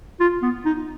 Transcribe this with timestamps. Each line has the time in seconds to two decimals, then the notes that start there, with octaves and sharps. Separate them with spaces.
0.20 F4
0.42 B3
0.65 D#4